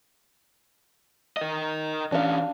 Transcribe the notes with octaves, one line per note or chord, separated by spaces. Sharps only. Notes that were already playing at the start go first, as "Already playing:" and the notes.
A#4 D#5
E3 C#4 D4 F5